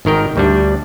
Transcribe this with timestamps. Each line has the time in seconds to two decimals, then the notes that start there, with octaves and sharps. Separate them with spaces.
0.05 G#1 D#3 A#4 G5
0.36 D2 G3 D4